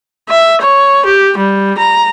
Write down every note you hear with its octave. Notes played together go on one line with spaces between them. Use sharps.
E5
C#5
G4
G3
A#5